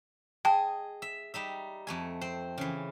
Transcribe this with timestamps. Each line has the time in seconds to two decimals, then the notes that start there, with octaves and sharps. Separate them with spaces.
0.45 G#4 D#5 G5 A5
1.02 E5
1.34 G3 D#4 E5
1.87 F2 A3 G#5
2.21 C4 C5
2.58 C#3 E3